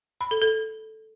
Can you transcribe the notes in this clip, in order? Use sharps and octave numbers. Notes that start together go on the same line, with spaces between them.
B5
A4
A4